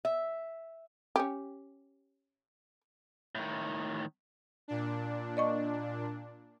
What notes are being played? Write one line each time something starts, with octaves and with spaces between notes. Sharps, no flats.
E5
C#4 G4
A2 D#3
A#2 D4
D5 D#5 C#6